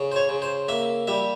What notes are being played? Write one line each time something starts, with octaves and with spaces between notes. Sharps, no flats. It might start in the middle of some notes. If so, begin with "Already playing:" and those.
Already playing: C#3
C5
C#5
C#3
C5
A#3 E5
G3 E5